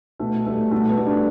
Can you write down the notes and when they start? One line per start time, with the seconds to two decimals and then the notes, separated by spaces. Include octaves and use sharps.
0.20 B2 A3
0.46 G3 A3
0.71 B2 A3
0.89 B3
0.97 G3
1.07 D4